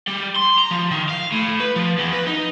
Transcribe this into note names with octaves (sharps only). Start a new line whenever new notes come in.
G3
C6
A#5
F3
D#3
F5
A2
B4
F3
E2
B4
D#4